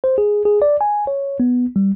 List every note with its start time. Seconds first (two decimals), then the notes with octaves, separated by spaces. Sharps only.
0.04 C5
0.18 G#4
0.45 G#4
0.62 D5
0.81 G#5
1.07 C#5
1.40 B3
1.76 G3